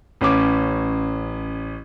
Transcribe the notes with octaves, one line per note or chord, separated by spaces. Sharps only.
A1 C#4 D6